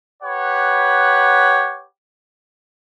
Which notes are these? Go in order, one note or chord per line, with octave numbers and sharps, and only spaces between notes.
G4 B4 C#5 F#5